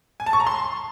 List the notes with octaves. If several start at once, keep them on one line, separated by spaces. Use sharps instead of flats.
G#5
A5
C#6
A#5
C6